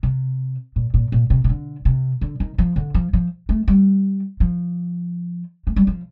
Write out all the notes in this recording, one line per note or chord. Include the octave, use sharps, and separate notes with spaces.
C3
A#2
A#2
A#2
C3
C3
D3
C3
D3
D#3
F3
D3
F3
F3
A3
G3
F3
A3
G3
F3